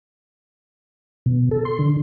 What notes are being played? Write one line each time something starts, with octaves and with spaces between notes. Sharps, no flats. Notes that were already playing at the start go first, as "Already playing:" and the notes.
B2
A4
C6
D3